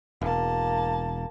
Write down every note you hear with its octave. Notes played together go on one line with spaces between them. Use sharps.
E1 A#3 A5